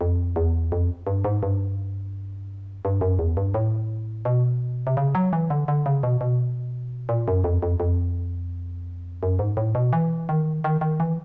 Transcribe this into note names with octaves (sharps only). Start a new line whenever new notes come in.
F2
E2
F2
G2
G#2
G2
G2
F#2
E2
G2
A2
B2
C3
C#3
F#3
E3
D3
D3
C#3
B2
B2
A#2
F#2
F2
F2
F2
F#2
G#2
A2
B2
E3
D#3
D#3
D#3
E3